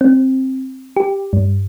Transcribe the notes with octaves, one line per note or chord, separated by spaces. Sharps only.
C4
G4
G2